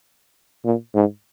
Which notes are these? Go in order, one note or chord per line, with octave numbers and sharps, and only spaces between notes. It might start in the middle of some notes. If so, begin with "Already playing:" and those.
A#2
G#2